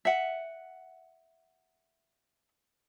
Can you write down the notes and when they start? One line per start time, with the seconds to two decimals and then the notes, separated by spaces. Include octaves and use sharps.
0.05 E5 F#5